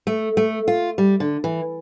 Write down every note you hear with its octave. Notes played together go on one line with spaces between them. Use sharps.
A3
A3
F4
G3
D3
E3